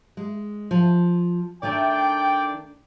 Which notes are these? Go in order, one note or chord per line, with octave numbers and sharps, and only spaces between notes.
G#3
F3
D#3 A3 D4 D5 G5